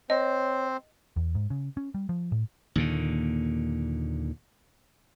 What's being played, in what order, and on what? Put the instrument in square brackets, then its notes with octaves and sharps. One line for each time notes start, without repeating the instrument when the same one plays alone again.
[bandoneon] C4 C5 [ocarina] C#5 [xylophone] D#5
[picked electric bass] E2
G#2
C#3
C#4
G3
F3
A2
[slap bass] D#2 A#2 D3